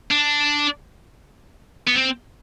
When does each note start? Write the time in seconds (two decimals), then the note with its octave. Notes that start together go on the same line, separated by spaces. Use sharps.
0.11 D4
1.87 B3
1.95 C4